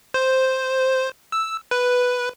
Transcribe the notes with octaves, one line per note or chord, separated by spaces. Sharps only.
C5
E6
B4